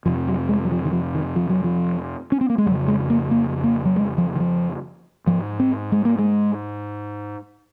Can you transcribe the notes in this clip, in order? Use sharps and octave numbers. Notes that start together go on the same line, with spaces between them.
F2 C3 F3
F#3
G#3
F#3
F3
D#3
F3
D#3
F3
F#3
F3
C#4
C4
A#3
G#3
F2 C#3 F#3
G#3
A#3
A#3
A#3
F#3
G#3
F3
D#3
F3
G#2 F3
C4
G#3
A#3
G#3